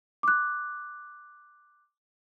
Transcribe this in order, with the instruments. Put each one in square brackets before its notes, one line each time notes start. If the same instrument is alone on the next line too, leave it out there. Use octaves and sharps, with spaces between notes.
[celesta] D6 F#6